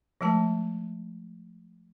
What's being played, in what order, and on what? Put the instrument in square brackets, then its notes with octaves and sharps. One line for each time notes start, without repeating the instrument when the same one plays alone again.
[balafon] F3 G#3 A3 A5